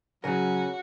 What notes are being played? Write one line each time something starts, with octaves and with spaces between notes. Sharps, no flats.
C#3 F#3 C#4 F#4 A#4